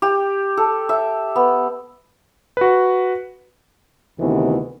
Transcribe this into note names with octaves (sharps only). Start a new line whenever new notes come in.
G4
A4
E5
B3
F#4 B4
D2 C3 D#3 E3 B3